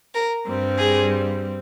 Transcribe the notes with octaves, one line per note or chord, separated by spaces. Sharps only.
A#4
G2 G3 C4
G#4